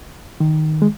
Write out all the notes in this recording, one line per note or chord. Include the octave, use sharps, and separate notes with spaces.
D#3
G#3